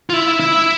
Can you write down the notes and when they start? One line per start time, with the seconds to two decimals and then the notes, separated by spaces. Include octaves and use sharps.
0.10 F4
0.14 E4
0.40 E4